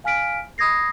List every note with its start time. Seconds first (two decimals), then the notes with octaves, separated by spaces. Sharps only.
0.04 F5 G#5 F6 B6 D7
0.58 B5 D#6 G#6 A#6 C7